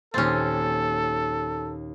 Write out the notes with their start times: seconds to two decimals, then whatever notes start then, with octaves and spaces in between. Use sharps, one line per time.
0.14 D#2 A#2 C4 C#4 A4 A6